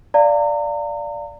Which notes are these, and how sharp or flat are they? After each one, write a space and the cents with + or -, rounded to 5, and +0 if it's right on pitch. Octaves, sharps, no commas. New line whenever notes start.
D5 +0 F5 -10 A#5 -35